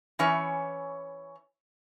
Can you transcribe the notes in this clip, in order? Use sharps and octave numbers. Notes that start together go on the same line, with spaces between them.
E3 C#4 E4 C#5